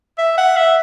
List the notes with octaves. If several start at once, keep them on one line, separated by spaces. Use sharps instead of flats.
E5
F#5
E5